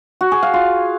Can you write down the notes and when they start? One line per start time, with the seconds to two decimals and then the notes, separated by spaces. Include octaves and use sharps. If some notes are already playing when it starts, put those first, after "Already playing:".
0.21 F#4
0.32 G#4
0.43 F5
0.54 F4